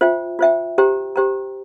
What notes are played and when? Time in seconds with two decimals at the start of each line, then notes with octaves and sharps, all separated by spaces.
0.01 F4 C5 E5 G5
0.39 F4 C5 E5 G5
0.78 G4 C5 G5 A#5
1.16 G4 C5 G5 A#5